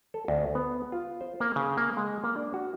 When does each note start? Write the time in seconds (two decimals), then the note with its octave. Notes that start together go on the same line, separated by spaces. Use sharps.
0.14 A4
0.28 D2
0.55 B3
0.92 F4
1.21 C5
1.40 A#3
1.56 C#3
1.77 A#3
1.97 G#3
2.24 A#3
2.36 D4
2.54 F#4